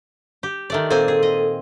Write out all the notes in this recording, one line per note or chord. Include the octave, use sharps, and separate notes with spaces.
G4
D#3 A3 D5
A#2 C4 A4 G#5
G#4
D#5